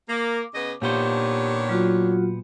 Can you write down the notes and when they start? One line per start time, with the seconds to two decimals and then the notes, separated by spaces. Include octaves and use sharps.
0.09 A#3 D6
0.55 C#3 B3 D#5
0.82 A#2 D#3 B3 D4 G4 C5 C#5
1.69 F#3 F4 F#4